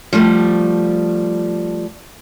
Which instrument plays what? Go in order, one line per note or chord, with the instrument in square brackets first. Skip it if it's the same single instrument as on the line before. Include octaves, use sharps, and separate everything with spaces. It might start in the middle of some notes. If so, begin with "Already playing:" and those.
[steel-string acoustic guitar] F3 G3 A3